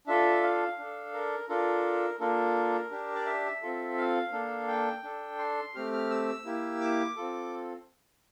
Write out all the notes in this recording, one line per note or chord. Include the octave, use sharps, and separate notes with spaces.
D4 F4 A4 E5
F5
D4 A4
A#4
D4 F4 A4 A#4
A#3 D4 F4 A4 A#4
D4 G4
D5
E5
C4 F4 A4
F5
A#3 D4 A4
G5
D4 A4
C6
A3 C4 G4 F6
F6
E6
A#3 E4 G4
D6
C4 F4 A4